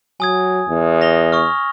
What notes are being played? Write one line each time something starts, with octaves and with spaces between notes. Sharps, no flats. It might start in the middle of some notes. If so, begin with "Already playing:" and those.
F#3 G#5 D#6 G#6
E2
A#6 F7 G7
C#6 D#6 F6